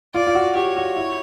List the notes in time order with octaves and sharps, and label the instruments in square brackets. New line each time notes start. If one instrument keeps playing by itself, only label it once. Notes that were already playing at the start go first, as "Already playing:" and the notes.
[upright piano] F4 [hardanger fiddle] D5
[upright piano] F4
F#4
[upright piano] G4 [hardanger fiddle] C#5
[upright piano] F#4
E4